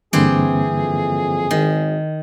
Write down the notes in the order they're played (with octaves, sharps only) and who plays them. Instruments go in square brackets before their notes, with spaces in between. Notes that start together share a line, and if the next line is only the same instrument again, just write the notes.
[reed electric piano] G2 D3 A#3 [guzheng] E3 G4 C5 [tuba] C4 [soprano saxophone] G#4
[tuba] F2
[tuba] G#1 [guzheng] D#3